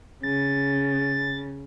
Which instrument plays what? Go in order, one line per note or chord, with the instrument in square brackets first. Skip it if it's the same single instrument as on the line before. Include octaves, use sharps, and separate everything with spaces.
[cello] C#3 [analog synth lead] A6